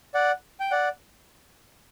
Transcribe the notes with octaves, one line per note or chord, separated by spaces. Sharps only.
D5 F#5
G5
D5 F#5